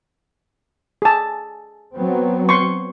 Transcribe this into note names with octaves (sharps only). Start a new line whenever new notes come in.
G#4 A5
F#3 B3 C4
C6 C#6